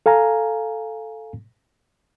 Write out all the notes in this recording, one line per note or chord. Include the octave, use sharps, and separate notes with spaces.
A4 F5 G#5 A#5